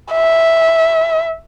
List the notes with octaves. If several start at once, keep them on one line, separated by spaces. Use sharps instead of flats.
E5